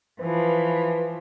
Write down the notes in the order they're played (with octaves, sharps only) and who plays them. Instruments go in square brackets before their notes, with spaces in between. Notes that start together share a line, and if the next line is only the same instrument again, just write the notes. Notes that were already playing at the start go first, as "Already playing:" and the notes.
[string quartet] E3 F3 [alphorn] B4